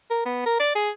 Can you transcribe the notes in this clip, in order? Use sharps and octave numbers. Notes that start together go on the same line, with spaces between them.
A#4
B3
A#4
D5
G#4